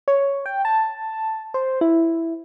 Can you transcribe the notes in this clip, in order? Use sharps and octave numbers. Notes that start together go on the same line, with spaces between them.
C#5
G5
A5
C5
E4